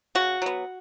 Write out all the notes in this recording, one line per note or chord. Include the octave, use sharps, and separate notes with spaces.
C#3 F#4
F#3 B3